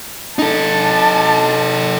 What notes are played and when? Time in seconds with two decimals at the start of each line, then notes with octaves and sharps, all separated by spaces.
0.39 D#4 A4 A5